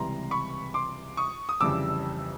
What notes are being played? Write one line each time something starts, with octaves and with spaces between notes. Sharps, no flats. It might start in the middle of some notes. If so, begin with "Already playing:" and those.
Already playing: C#2 C3 E3 G3 A#5 C6
B5 C#6
C6 D6
C#6 D#6
D#6
G1 F2 C#3 E3 G3 D6 E6